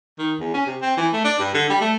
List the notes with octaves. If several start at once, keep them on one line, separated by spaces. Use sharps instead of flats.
D#3
E2
C#4
C3
C4
E3
A3
D4
G2
D3
G3
A3